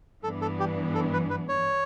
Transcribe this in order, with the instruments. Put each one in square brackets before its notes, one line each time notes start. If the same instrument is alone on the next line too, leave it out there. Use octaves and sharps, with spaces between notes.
[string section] G2 E3 B3 D4 [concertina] A4
[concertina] A4
G4
A4
B4
B4
C#5